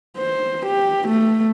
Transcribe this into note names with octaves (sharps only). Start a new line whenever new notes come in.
C5
G4
A3